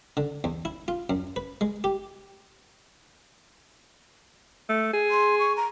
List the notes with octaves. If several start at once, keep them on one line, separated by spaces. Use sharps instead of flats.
D3
E2
E4
F4
F#2
B4
G#3
G4
A3
G#4
C6
C#6
A#5